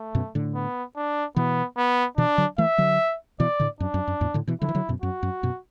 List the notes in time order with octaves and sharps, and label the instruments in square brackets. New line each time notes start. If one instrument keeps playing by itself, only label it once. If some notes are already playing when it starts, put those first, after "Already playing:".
Already playing: [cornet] A3
[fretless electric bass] F#2 B2
A2 D3
[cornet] B3
D4
[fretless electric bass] B2 E3 [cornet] B3
[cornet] B3
[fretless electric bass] B2 E3 [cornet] D4
[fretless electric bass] D3 F#3
[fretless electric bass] E3 A3 [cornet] E5
[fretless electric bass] D3 F#3
[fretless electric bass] B2 E3 [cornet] D5
[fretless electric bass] A2 D3
[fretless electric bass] F#2 [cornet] D4
[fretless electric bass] F#2
F#2
E2 A2
A2 D3
B2 E3
[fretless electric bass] D3 F#3 [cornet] E4
[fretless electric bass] E3
D3 F#3
F#2 B2
[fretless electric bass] F#2 [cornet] F#4
[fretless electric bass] F#2
F#2 B2